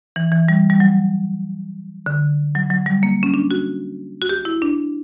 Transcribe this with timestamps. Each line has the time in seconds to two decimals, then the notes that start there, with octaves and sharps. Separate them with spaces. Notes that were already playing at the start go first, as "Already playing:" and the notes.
0.16 E3
0.32 E3
0.48 G3
0.70 G3
0.80 F#3
2.06 D3
2.55 F#3
2.70 F#3
2.86 G3
3.03 A#3
3.23 C#4
3.34 D4
3.51 F#4
4.22 F#4
4.29 G4
4.45 E4
4.62 D4